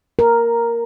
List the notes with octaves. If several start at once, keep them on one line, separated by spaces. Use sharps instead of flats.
A#4